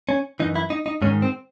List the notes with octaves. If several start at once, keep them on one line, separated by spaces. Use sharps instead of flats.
C#4
F#2 E3 D#4
E4
D#4
D#4
G#2 D#3 C#4
C4